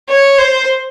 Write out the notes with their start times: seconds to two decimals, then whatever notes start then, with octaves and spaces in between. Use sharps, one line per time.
0.09 C#5
0.38 C5